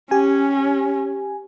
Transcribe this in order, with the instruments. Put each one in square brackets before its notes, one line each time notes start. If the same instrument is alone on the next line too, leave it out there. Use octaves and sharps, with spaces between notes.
[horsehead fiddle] C#4 [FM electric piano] G4 G#5